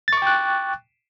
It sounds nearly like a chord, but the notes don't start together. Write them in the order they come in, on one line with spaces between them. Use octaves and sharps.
A6 C#6 D6 G5 F#6